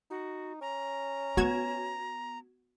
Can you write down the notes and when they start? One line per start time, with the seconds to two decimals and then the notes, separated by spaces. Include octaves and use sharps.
0.10 D#4 F#4
0.61 C#4 A#5
1.37 B3 F#4 G#6 E7